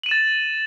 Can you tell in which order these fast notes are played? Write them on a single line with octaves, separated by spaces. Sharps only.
F#7 D#7 E7 A6